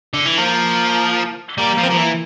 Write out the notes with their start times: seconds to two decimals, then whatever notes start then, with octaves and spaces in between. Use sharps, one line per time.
0.14 D3
0.26 E3
0.38 F3 A#3
1.58 G3 A#3
1.78 F3
1.83 C4
1.88 F3 A#3
1.97 E3